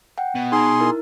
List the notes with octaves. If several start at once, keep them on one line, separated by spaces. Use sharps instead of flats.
F#5 G5
B2
D#4 G#4 A#5 C6
E4 A#4